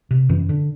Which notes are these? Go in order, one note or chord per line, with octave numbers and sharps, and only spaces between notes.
C3
F#2 E3
D3